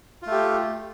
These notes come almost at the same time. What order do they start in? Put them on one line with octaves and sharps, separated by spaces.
F4 A3 G4